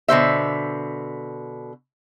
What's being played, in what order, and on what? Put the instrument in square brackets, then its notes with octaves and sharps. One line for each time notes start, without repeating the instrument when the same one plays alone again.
[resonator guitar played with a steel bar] B2 D3 C5 E5